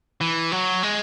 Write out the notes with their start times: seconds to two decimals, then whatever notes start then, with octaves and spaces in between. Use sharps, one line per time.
0.21 E3
0.52 F#3
0.83 G#3